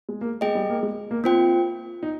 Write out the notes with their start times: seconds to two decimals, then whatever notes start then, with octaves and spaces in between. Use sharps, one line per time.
0.09 G#3
0.21 A#3
0.41 G#3 G#4 D#5 G5
0.55 G3
0.70 A#3
0.83 G#3
1.11 A#3
1.24 A#3 C4 F4 C5 G5
2.03 D#4